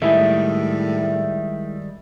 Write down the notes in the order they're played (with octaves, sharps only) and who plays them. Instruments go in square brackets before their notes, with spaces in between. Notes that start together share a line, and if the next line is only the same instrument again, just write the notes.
[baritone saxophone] A2 [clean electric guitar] D#3 G3 [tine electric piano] G#3 E4 G#4 [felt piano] E5